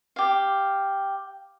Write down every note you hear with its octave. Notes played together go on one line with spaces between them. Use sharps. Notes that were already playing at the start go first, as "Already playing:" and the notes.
G4 F5